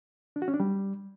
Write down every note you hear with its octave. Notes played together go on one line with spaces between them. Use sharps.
D4
F#4
C#4
D4
G3